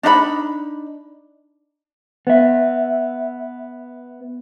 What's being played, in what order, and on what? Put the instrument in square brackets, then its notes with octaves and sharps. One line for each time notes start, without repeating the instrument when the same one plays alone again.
[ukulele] D4 D#4 D#5 B5
[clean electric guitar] B3 E5